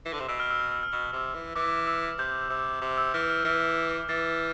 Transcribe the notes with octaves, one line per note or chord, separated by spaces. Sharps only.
E3
D3
C3
B2 E6
F6
E6
F6
E6
F6
B2 E6
F6
C3 E6
E3
E3 D6
E6
C3 G6
C3 E6
C3 D6
E6
E3 F6
F6
E3 F6
E3 A6